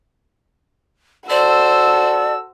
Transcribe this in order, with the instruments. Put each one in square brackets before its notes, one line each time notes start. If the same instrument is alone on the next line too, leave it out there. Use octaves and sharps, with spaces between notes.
[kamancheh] F#4 E6 [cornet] A4 [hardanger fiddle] C5 [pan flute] D5